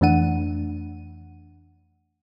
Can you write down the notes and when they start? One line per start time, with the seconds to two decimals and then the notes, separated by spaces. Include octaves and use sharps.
0.01 F2 E3 A3 D4 F#5 D#7